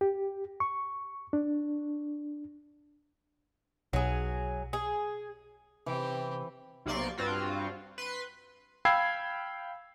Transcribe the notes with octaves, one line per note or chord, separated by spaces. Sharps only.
G4
C#6
D4
B1 F#3 G#4
G#4
C3 E3 C4 G4
B1 C3 A#3 D5 C6 C#6
G2 C4 F4 F#4
B4 C6
F5 G5 B5 E6 G#6 C7